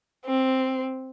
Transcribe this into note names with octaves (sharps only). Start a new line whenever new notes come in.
C4